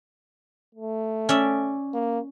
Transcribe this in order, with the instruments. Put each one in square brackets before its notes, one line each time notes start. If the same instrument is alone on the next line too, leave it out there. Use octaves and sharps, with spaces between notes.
[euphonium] A3
[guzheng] C#4 D5 E5
[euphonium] A#3